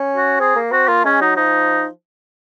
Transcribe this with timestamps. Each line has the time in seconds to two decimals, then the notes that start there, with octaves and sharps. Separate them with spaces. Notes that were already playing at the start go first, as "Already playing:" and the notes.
Already playing: C#4
0.16 F#4
0.40 C4 G#4
0.56 A#3
0.72 C4 F#4
0.88 A#3 F4
1.05 G#3 C#4
1.21 F#3 D#4
1.36 F3 D#4